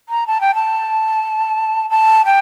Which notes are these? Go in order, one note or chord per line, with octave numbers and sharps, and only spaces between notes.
A#5
A5
G5
A5
A5
G5